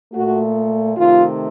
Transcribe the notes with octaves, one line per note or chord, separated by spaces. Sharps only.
A#2 A3 F#4
C3 D#3 A3 F4